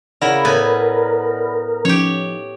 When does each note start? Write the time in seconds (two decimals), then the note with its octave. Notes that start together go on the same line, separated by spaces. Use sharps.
0.21 C#3 E4 A#4 D5 F#5 B5
0.45 A2 B3 A#4 G#5
1.85 F3 C#4 D#4 G4 C#5